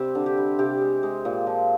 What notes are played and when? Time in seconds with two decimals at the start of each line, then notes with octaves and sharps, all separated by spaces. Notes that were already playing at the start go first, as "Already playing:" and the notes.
Already playing: C3 G3 C4 G4 C5
0.15 D3
0.26 G4
0.37 G3
0.59 C3 G4
0.81 G#3
1.03 G#3
1.25 A#2
1.47 F3